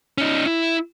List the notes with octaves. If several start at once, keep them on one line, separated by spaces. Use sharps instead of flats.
C#4 D#4
E4